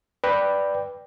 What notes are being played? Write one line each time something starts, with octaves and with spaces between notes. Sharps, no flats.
B4 D5 G5